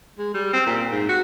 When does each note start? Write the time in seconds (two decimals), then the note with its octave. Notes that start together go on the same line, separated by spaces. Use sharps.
0.18 G#3
0.34 G3
0.53 C4
0.67 A#2
0.91 G#2
1.09 F#4